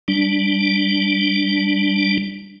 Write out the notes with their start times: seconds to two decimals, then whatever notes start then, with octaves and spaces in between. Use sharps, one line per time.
0.08 G3 D4